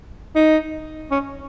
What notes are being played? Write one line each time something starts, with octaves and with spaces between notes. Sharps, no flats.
D#4
C#4